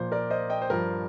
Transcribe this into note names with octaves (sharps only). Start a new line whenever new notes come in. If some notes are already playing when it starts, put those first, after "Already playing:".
Already playing: A#2 F3 C5
A#4 D5
C5 D#5
D#5 G5
C5
G2 F3 A#4